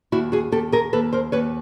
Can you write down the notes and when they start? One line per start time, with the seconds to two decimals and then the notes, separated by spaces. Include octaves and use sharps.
0.12 D#2 E4 F#4
0.32 F#4 G#4
0.52 D#2 G4 A4
0.72 G#4 A#4
0.93 D#2 A4 B4
1.13 A#4 C5
1.32 D#2 B4 C#5